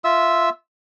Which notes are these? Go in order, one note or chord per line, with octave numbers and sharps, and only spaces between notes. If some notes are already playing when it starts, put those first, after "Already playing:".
F4 E5 E6